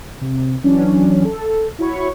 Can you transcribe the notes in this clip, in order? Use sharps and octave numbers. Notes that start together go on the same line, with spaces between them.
C3
E3 F#3 C#4 D4
A4
E4 F#4 C#5 B5 C#6